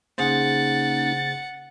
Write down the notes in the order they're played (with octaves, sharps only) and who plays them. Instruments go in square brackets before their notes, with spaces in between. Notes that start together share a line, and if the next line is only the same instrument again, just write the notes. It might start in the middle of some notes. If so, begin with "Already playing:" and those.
[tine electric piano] C#3 G#4 C5 [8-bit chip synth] A#3 C#4 D#4 [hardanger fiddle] F#5 [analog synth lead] A6